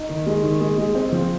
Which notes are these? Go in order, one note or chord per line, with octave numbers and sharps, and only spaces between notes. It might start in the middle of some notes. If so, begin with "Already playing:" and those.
Already playing: D#4
D#3
G#3
D#3
G#3
G#3
C4
F3